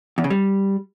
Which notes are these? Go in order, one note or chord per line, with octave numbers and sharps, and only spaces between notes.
E2
C#3
G3